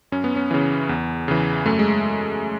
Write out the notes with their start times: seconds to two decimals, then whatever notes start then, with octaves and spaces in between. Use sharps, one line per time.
0.12 F#2 C#4
0.24 B3
0.36 C#4
0.51 C#3 E3
0.89 E2
1.28 C#3 E3
1.66 F#2 A3
1.79 G#3